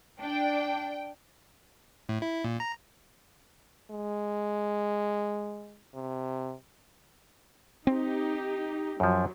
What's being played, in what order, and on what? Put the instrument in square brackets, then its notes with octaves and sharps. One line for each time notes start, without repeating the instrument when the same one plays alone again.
[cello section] D4 [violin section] G5
[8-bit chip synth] A2
E4
A#2
A#5
[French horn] G#3
C3
[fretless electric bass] C4 [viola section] D#4 G4
[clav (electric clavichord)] F#2 F3 [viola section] F#3